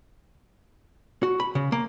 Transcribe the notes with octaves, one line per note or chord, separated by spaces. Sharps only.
F#4
B5
C#3
A#3